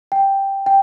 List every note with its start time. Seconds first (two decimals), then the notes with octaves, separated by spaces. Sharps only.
0.12 G5
0.66 G5